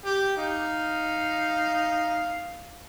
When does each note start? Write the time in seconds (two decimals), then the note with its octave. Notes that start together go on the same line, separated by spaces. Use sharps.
0.05 G4
0.37 D#4 F5